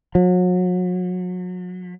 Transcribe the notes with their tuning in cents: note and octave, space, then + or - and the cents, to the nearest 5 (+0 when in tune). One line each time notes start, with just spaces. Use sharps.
F#3 -35